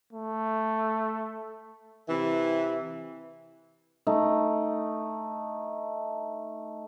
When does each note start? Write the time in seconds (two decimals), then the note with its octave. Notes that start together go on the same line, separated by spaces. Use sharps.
0.13 A3
2.09 C3 E3
4.07 A3 D#4